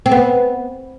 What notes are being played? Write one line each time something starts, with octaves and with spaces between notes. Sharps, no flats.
C4
B3